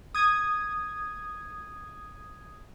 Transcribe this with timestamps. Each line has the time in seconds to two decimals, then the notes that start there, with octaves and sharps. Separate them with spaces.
0.15 D#6 G#6